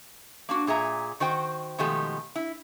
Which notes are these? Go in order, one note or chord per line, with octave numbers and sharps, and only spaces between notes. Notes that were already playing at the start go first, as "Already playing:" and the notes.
A#3 D4 F#4
A#2 G#4 E5 A#5
D#3 F#4 C5 G5
B2 D#3 F3 G#3 A3 G4
E4